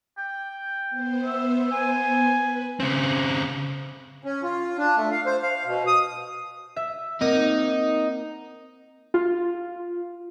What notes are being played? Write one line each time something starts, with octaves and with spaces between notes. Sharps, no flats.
G5
B3 C5
E5
G#5
B4
C#3 C4
C#4
F4
D4
A3
F5
C5
F5
B2
D#6
E5
A#3 C4 D#4
F4